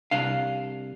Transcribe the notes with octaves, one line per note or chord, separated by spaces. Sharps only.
C2 D4 F5